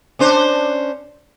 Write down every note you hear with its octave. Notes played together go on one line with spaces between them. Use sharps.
C#4 D4 C5